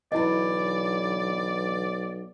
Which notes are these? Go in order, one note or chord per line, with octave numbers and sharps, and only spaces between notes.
B1 D3 E3 E4 D5 D#5